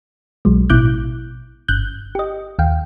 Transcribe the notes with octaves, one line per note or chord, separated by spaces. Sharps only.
B1 F#3 G#3
A1 B2 E4 D6 F#6 G6
G1 F#6 G6
G4 D#5
D#2 F5 G5